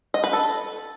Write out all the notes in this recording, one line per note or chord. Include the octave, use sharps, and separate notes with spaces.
D#5
B4
A4